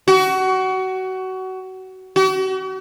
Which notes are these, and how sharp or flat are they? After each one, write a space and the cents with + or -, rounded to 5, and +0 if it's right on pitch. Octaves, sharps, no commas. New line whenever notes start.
F#4 +25
F#4 +40